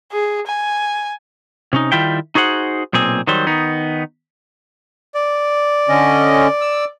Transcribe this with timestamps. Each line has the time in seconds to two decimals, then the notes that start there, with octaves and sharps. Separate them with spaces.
0.12 G#4
0.47 G#5
1.73 C3 C#4 D#4
1.92 D#3 G3 E4 F4 E5 G5
2.35 D#4 F#4 G#4 C5 F#5
2.93 B1 A#2 C4 G#4
3.27 D#3 F#3 G3 C5
3.47 D#3 B3 D#4
5.14 D5
5.89 D3 C#4 D#5
6.61 E6